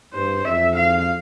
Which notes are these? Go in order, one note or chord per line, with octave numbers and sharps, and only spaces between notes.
G2 C5
F2 E5
F5